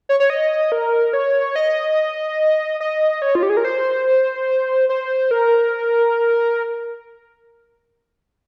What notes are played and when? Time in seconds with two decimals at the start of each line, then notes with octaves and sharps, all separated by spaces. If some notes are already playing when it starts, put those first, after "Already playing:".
0.09 C#5
0.20 C#5
0.30 D#5
0.72 A#4
1.13 C#5
1.56 D#5
2.80 D#5
3.22 C#5
3.35 F4
3.43 G4
3.50 G#4
3.57 A#4
3.65 C5
4.89 C5
5.31 A#4